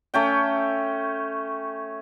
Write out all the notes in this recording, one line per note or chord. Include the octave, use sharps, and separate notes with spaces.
A3 C#4 G5